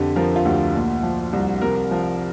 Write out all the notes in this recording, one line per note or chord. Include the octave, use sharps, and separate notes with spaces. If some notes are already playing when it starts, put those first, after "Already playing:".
Already playing: F2 D3 G4
F3 A#4
F4
D2 G4
A#2
F3
C2
C3 A#4
F3